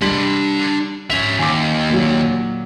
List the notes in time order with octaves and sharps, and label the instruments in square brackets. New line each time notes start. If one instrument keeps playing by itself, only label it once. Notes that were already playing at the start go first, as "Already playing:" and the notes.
[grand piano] G3 B6 F#7 [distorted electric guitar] D4 C6
[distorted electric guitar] C#4 E5 [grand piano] F7
[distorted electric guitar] D#2 [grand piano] G#5 D6
[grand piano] A#2 F#3